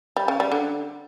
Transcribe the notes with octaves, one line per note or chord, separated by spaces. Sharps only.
G3
C#3
G3
D3